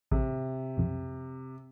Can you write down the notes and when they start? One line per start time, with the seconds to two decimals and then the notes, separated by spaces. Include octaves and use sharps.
0.11 A1 C3
0.77 B1 F2